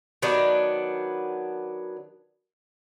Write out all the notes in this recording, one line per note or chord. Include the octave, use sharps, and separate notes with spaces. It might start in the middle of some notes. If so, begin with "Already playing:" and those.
D#3 F#3 B3 D4